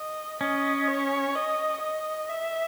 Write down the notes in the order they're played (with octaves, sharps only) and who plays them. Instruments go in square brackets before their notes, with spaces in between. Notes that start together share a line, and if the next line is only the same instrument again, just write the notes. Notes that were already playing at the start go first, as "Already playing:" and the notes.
Already playing: [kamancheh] D#5
[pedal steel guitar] C#4 [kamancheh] D#5
[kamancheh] C#5
D#5
D#5
E5